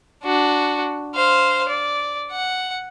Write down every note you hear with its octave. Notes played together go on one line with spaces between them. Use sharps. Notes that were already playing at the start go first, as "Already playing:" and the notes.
D4 F#4
C5 F5
D5
F#5